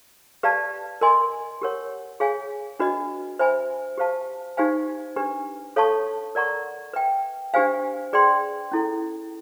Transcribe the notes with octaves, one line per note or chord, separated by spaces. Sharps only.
G4 B4 D5 F5 A5
A#4 D#5 G#5 C6
G4 A#4 C#5 F#5
G#4 C#5 F5 G#5
D4 F#4 B4 D#5
C5 E5 G#5 B5
G4 C5 F5 A5
D#4 G4 C5 F5 G#5
D4 G4 B4
A4 C#5 F5 A5 C#6
A#4 D5 F#5 A#5 C#6
B4 E5 G5
D4 G4 C5 F5 G#5
G#4 B4 D5 G5 C6
C#4 E4 A4